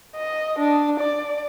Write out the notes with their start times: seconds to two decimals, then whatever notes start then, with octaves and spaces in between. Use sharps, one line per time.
0.16 D#5
0.59 D4
1.00 D5